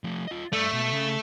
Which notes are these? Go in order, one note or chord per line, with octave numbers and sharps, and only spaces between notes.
F3 A3
F4 D#5
G2 A3 D5
B2
C#3